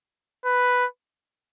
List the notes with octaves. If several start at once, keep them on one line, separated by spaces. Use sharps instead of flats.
B4